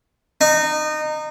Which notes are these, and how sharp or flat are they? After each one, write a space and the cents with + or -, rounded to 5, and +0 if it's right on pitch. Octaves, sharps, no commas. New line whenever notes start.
D#4 -25